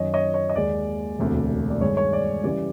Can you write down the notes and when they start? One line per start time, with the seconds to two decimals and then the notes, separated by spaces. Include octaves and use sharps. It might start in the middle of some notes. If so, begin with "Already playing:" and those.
Already playing: F#2 D#3 F#3 C#5 D#5
0.14 C#5 D#5
0.34 C#5 D#5
0.49 D#5
0.55 D#2 D#3 G#3 D5
1.19 E1 D2 C3
1.70 D5
1.81 G2 D#3 G#3 C#5
1.97 C#5
2.13 D5
2.44 C#3 E3 G3 D5